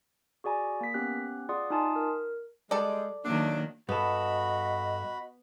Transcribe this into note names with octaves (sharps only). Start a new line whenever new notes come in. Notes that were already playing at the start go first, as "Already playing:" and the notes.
F#4 G#4 D5 G#5 A#5
A#3 B6
B3 C#4 G4 F#6
F4 G#4 D5 F#5 C6 D#6
D#4 F4 G#5 A5 C6 D#6
A#4
G3 G#3 A4 D5
D#3 F#3 A3 A#3 D4
G2 B3 F#4 A4 D#5 B5